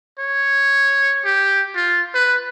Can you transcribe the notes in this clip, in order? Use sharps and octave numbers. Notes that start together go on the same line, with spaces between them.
C#5
G4
F4
B4